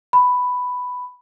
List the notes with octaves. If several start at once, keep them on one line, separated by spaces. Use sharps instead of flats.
B5